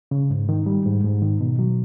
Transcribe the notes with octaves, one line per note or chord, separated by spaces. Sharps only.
C#3
G#2
D#3
G3
G#2
G#2
D#3
B2
F#3